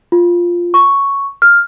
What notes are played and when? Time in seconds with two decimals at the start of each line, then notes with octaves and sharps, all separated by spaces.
0.12 F4
0.74 C#6
1.42 F6